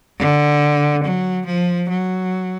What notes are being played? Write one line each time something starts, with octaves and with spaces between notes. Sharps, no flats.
D3
F#3
F3
F#3